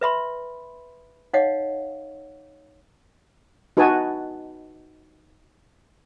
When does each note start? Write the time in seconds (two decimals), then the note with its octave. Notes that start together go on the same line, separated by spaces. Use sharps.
0.01 B4 E5 B5 C6
1.33 D#4 C#5 D#5 F5 F#5
3.77 D#4 F#4 B4 F#5 G#5 A5